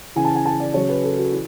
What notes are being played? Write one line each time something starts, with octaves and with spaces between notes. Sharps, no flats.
C#3 E3 G#5
A5
G#5
A5
D5
C#3 F#3 C#5
B4
A4
F#4
E3